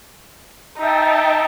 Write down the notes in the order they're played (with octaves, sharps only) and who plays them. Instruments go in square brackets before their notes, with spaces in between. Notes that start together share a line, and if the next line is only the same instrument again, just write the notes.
[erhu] D#4 [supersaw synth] E5 G5 A5